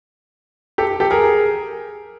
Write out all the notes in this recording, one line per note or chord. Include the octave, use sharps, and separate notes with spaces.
G4 A4
G4 A4
G#4 A#4